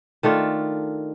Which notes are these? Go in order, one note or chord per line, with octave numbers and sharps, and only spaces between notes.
D#3 A3 D4 F4